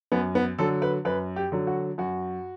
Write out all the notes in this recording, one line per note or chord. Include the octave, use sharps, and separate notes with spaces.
F#2 B3
B3
D3 F#3 A4
B4
F#2 B4
G4
D3 F#3
F#4
F#2 F#4